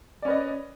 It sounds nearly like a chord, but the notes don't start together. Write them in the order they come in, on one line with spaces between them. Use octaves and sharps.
D5 C#4 B4 D#5